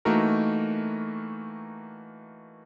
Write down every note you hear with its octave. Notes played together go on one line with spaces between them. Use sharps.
E3 A3 A#3 D#4 F#4 A#4